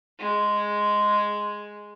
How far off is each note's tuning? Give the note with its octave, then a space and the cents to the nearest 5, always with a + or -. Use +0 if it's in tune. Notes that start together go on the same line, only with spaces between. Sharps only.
G#3 +0